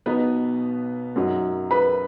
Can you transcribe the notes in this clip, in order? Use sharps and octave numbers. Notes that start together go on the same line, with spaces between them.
B1 B2 B3 D#4 B4
F#2 F#3 D#4
B4 B5